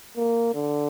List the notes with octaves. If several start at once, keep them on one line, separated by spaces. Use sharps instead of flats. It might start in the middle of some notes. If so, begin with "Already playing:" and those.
A#3
D3